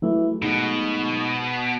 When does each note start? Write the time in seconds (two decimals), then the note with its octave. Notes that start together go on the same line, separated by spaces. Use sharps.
0.02 E3 F#3 A3
0.42 G#2 B2